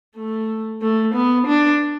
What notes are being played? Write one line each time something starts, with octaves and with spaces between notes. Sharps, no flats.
A3
A3
B3
D4